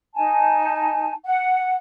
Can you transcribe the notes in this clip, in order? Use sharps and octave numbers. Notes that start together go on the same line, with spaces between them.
D#4 G#5 A5
F#5